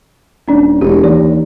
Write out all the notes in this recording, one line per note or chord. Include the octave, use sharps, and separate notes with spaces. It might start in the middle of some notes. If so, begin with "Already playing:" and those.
D#1 C#4 D4 D5
E1 G4
D#2 E3 G4 D5